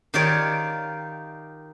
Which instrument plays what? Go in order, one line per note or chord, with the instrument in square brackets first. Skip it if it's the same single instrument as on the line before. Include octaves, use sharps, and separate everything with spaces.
[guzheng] D#3 F4 G4 A#4 C#5 D5